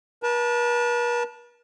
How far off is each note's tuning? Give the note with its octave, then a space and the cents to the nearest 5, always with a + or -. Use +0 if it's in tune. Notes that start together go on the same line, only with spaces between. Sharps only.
B4 -45 A5 +0